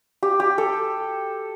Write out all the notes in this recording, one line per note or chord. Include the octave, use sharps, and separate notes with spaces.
G4
G4
A4